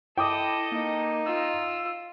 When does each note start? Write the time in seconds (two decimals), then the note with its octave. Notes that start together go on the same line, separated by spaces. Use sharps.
0.18 E4 A4 D#5 G5 D6 D#6
0.72 A#3 D#4
1.26 F4 E6